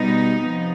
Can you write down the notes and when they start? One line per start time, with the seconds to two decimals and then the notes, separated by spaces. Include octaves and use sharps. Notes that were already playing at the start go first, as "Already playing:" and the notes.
Already playing: B2 G3 B3 D#4
0.42 C3 F3 B3